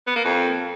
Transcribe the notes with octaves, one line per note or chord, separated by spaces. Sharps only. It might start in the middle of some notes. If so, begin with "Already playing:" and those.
B3
A#3
F2